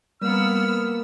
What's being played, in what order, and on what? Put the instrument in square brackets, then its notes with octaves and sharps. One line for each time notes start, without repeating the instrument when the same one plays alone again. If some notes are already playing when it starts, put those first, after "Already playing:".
[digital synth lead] G3 [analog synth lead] A#3 [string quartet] B3 E6 [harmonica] F6